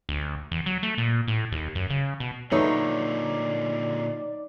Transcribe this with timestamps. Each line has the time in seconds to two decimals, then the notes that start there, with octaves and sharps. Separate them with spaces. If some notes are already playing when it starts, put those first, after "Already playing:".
0.09 D2
0.52 E2
0.66 F#3
0.83 A3
0.98 A#2
1.28 A2
1.52 D#2
1.75 F#2
1.90 C#3
2.20 B2
2.52 A#2 D3 F#3 A3 B3 D#4 C#5 D5